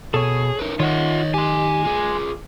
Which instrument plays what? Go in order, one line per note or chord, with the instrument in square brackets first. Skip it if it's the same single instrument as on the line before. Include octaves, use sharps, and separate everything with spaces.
[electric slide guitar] B2 [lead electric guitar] G#4 [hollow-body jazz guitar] A4 C#5
[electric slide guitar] D#4 A#4 B4
[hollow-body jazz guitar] D#3 [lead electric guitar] F4 F#5 [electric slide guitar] C#5 D#5
[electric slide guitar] G4 [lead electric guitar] G#5 C6
[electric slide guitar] F4 G#4